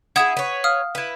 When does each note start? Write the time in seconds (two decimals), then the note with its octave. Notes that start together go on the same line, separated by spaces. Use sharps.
0.16 E4 G#4 F#5 D#6 G#6
0.37 B4 C#5
0.64 F5 D#6 F6
0.95 E4 B4